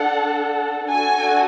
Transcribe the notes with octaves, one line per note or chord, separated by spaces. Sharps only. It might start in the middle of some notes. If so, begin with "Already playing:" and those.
Already playing: D4 A4 F#5
D4 F#4 A4 G#5